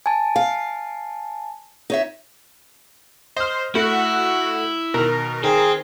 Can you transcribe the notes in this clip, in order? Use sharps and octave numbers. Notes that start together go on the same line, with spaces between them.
G#5 A5
F5
D#4 C#5 E5
C5 D#5 F6
A3 E4 F#4
B2 D#3 A#4
D#3 G#4 C5 G5